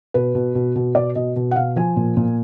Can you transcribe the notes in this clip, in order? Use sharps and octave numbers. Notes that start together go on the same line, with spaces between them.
B2 B4
B2
B2
B2
B2 D5
B2 D#5
B2
F#5
B2 F5
F3 G#5
A#2
A#2